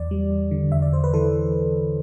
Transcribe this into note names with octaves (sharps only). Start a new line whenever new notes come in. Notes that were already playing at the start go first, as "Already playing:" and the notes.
Already playing: E2 D5
G3
E2
D3
E2 E5
D5
E2 C5
B4
E3 A4